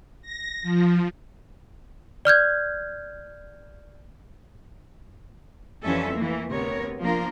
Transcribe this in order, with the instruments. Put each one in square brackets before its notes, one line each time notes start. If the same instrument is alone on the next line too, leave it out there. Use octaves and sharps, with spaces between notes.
[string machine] A#6
F3
[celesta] D5 F6 G6 G#6
[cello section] F2 E3 G3 C#4 A4 E5
E3 A3 A#3
D2 C3 B3 A#4 C#5
F3 A#3 D4 F4 A#4